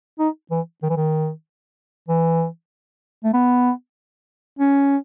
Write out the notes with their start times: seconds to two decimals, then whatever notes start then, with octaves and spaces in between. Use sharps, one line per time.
0.19 D#4
0.51 E3
0.83 D#3
0.89 E3
0.97 D#3
2.08 E3
3.24 A3
3.33 B3
4.59 C#4